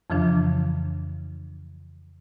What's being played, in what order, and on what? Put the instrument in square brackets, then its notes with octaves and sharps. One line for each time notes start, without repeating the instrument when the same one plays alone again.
[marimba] F2 C#3 E3 F3 D4